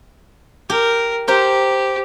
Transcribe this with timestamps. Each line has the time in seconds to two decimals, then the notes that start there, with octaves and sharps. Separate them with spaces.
0.70 G4 A#4
1.28 G4 A#4 C5 G5